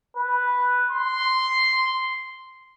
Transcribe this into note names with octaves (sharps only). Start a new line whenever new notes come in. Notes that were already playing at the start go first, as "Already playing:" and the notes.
B4
C6